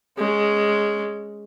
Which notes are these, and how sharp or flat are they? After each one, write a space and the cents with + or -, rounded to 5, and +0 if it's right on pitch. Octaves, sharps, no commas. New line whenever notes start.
G#3 +0 C#4 +0